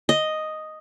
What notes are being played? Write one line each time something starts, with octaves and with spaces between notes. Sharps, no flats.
D#5